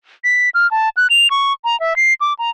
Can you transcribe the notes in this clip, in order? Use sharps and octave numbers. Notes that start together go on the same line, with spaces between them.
B6
F6
A5
F#6
F7
C#6
A#5
E5
C7
D6
A#5